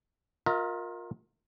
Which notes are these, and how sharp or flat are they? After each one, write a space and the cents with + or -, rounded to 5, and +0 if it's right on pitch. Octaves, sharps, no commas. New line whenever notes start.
F4 +30 A#4 +0 E5 -45